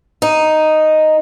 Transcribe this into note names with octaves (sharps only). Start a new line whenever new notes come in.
D#4